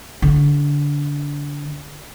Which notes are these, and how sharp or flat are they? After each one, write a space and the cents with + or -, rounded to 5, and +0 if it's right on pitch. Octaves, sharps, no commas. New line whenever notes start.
D3 -20